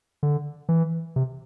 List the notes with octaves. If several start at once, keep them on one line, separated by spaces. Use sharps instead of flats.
D3
E3
C3